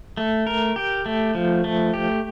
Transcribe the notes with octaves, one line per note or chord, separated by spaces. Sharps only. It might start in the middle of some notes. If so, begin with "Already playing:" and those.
A3
A#4
G4
A3
F3
A3
G4